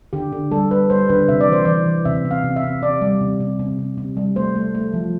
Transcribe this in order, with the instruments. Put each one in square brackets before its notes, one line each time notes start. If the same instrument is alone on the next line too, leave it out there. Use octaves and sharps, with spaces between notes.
[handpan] D3 G4
D3
G3 A4
G3 B4
G3 C5
D3 B4
C3 E5
D5
E3 C5
E3 D5
E3
C3 E5
C3
F5
C3
E5
C3
C3 D5
G3
C3
C3
C3
C3
C3
G3
A3 C5
A3
A3
F3